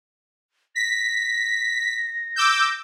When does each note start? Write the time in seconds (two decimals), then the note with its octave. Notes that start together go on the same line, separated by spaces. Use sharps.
0.75 A#6 B6
2.36 D6 E6 G6